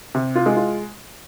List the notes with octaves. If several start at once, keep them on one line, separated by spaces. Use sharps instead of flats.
C3
F4
G#3
F4